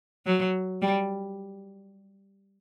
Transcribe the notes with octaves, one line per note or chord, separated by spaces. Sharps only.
F#3
G3